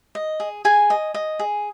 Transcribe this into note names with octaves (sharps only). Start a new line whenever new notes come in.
D#5
G#4
G#4 G#5
D#5
D#5
G#4